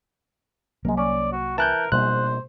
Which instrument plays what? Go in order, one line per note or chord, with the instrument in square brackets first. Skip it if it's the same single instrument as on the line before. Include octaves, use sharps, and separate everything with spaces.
[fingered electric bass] C2 F#3 A#3 [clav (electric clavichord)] G#3 A#4
[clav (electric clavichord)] C#4 [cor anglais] D5
[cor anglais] F#4
[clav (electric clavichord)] E3 [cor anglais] A#4 [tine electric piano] A5 F#6 G6
[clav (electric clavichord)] A#1 G#2 [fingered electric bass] B2 G3 A#3 [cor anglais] C5 [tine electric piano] F#6